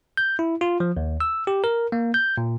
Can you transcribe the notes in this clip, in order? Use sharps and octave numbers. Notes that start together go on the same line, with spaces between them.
G6
E4
F4
F3
D#2
E6
G4
A#4
A#3
G6
A#2